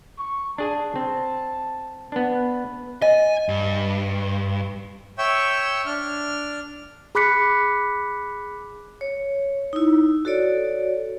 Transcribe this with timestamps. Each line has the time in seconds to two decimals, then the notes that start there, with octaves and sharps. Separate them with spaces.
0.18 C#6
0.58 D4 G#4 G#5 A5
0.96 C4
2.12 B3 D4 B4
3.02 D#5 G#5
3.49 G2
5.18 C#5 E5 G5 C#6 E6 G6
5.86 D4 F6
7.15 G#4 B5 D6 F#6 B6 C#7
9.01 C#5
9.73 D#4 E4
10.25 F#4 A4 C#5 D5